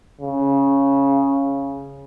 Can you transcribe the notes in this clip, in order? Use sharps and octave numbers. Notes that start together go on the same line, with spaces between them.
C#3